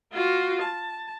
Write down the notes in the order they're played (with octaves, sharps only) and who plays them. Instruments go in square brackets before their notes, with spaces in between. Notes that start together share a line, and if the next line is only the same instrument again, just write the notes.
[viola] F4 F#4
A5